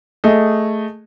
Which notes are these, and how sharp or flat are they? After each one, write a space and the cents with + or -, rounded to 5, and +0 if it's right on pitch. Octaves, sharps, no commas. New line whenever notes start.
A3 +0 G#4 +0 D#5 +0